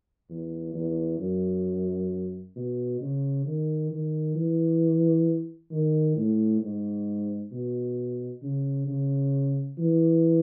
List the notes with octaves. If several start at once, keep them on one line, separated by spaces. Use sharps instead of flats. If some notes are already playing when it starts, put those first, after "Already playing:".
E2
E2
F#2
B2
C#3
D#3
D#3
E3
D#3
A2
G#2
B2
C#3
C#3
E3